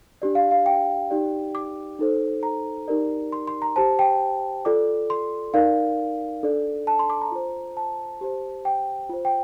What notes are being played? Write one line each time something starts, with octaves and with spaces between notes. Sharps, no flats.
D4 G4 D5
F5
F5
G5
D#4 G4 D5
D6
D#4 A4 C5
A#5
D#4 G4 A#4 D5
C6
C6
A#5
G4 C5 A5
G5
F4 A4 D5 D6
C6
D#4 A#4 D5 F5
D4 A4 D5
A5
C6
D6
A#5
F4 C5
A5
G4 C5
G5
F4 C5
G5